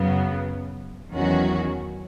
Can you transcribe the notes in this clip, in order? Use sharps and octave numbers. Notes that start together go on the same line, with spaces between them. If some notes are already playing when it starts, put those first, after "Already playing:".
Already playing: F#2 C#3 F#3 B3
E2 D#3 F#3 C#4 F#4